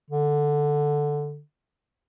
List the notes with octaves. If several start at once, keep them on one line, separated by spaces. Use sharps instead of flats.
D3